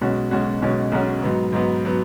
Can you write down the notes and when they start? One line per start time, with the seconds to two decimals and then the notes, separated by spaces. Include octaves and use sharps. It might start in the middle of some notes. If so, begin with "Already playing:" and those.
0.01 B1 B2 G#3 C#4 F#4
0.31 B1 B2 G#3 C#4 F#4
0.62 B1 B2 G#3 C#4 F#4
0.92 B1 B2 G#3 C#4 F#4
1.23 G#2 F#3 B3
1.52 G#2 F#3 B3
1.85 F#3 B3